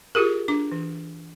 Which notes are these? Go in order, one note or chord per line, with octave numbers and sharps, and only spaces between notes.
F4 G4 G#4 A#4
D4 D6
E3